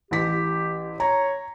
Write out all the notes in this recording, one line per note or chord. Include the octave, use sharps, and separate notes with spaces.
A1 G4 B6
C#5 A#5